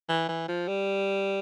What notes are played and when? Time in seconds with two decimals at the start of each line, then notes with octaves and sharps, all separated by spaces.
0.09 E3
0.29 E3
0.48 F3
0.68 G3